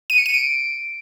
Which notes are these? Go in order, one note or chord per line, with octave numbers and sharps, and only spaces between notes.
D#7
C#7
D#7
D7